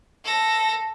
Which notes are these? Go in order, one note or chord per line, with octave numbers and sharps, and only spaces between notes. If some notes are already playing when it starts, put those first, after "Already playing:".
A4 A#6